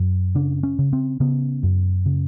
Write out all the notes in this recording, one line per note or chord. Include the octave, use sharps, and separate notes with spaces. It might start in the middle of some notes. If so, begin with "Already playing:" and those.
Already playing: F#2
C#3 D4
C#4
C#3
C4
C#3 B3
F#2
C#3